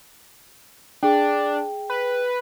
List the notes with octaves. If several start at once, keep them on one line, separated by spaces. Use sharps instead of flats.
D4 G#4 G5
B4